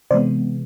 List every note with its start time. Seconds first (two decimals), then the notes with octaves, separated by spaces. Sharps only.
0.11 C3 E3 G#3 B3 C5 D5